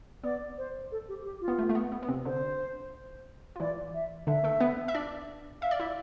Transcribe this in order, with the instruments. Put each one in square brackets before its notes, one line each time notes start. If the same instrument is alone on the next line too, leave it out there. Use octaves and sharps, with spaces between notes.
[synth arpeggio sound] B3 [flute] D5
[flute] C5
A4
G4
G4
F4
[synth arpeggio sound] B3
A3
A3
B3
B3
B3
C3 C4
[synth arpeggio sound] D3 D4 [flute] C5
[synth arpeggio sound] F4
[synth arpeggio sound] E3 E4 [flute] D5
[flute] E5
[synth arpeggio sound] D3 D4 [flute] E5
[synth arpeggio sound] A3 A4
B3 B4
E5
D4 D5
[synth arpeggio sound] E5 [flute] F5
[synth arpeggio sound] D5
E4 E5